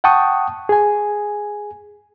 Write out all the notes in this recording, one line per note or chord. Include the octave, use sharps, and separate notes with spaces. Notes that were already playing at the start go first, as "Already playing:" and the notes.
F#5 G5 A5 C#6 D#6
G#4 G#5